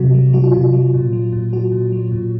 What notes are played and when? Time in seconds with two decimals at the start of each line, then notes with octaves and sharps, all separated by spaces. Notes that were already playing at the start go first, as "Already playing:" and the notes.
Already playing: C3 F#3 F#4
0.14 F#3
0.33 F#3 F#4
0.44 F4
0.54 C3
0.61 F4
0.73 F#3
0.94 A#2
1.13 F#3
1.33 A#2
1.53 F#3 F#4
1.72 A#2
1.92 F#3
2.12 A#2